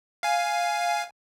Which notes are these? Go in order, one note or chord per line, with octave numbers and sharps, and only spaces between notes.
F5 G#5